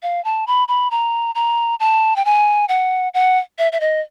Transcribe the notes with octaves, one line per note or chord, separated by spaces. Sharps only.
F5
A5
B5
B5
A#5
A#5
A5
G5
G#5
F#5
F#5
E5
E5
D#5